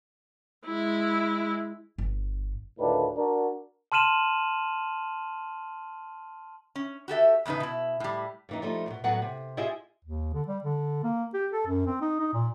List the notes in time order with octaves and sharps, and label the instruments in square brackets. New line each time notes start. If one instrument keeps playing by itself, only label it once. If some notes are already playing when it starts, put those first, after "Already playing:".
[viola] G#3 E4
[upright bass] G1
[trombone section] D2 A2 D#3 D4 F4 B4
D4 F#4 A#4
[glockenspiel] A5 C6 F6 D#7 E7 F#7
[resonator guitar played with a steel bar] C#4
F#4 G4 A4 E5
E2 A2 C#3 D#4 B4
B2 E4
A2 G3
[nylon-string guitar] G2 E3 D#4
F3 G3 A3 D#4
D#2 B2
A2 F#3 A3 B3 F#4 F#5
C3
E4 F4 G4 G#4 D#5 E5
[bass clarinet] D#2
D3
G3
D3
A#3
G4
A4
F#2
C4
D#4
D#4
A#2